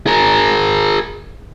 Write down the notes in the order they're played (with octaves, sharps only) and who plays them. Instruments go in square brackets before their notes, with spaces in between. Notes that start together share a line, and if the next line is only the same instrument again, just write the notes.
[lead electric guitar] G#4 A#4